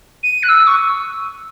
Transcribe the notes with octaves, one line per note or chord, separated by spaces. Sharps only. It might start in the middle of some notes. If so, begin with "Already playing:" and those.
D#7
F#6
E6
C#6